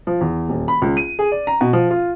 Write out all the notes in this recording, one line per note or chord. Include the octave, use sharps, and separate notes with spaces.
F3
E2
D#1
B5
C#2
D#7
G#4
D5
A#5
B2
F3
F4